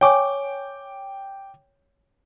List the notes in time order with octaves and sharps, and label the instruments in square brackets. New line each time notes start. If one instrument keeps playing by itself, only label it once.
[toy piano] C#5 G#5 C#6 [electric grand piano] G5 D6